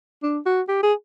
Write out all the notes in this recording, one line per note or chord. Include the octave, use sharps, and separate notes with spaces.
D4
F#4
G4
G#4